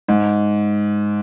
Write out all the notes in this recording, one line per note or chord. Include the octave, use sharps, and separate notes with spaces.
G#2